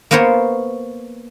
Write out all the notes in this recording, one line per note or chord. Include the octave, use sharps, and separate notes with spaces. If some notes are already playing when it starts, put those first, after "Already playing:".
A#3 B3 A#4 C5 C#5